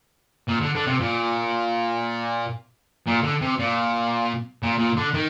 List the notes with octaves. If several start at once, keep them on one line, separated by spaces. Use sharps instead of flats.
A#2
D3
D3
C3
A#2
A#2
D3
C3
A#2
A#2
A#2
D3
D#3